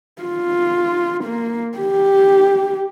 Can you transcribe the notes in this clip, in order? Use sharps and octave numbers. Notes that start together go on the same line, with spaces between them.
F4
A#3
G4